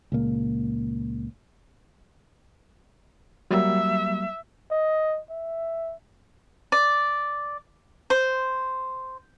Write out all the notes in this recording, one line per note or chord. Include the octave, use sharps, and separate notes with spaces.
C#2 A#2 A#3
F#3 G3 A#3 E5
D#5
E5
D5
C5